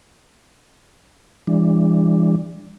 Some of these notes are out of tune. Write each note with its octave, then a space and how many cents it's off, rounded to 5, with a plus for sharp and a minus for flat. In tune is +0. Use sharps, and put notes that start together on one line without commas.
E3 +30 G#3 -45 D4 +0